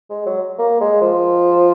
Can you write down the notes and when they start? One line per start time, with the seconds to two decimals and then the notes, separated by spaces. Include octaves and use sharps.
0.10 G#3
0.26 F#3
0.59 A#3
0.81 G#3
1.02 F3